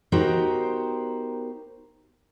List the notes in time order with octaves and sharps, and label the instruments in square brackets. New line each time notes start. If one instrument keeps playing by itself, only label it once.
[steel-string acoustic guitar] B3 D#4 F#4 G4 A#4 C5